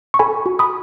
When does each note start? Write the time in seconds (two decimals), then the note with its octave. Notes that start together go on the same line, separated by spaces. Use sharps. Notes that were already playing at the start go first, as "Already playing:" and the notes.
0.14 C#6
0.19 A4 G#5 B5
0.46 F#4
0.59 B5 D#6